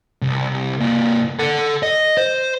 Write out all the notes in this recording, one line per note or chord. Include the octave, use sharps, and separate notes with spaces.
C2
C3 A#3
A4 F#5
D#5
C5